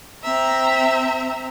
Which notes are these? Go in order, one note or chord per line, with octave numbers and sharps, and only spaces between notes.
C4 E5 A#5